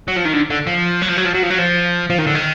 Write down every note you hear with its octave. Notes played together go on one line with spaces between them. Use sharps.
F#3
F3
D#3
D3
D3
F3
F#3
F3
F#3
F3
F#3
F3
F#3
F3
F3
D#3
D3
D#3